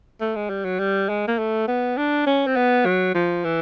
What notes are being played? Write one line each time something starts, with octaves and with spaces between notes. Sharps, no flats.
A3
G#3
G3
F#3
G3
G#3
A#3
A3
B3
D4
C#4
C4
B3
F#3
F3
E3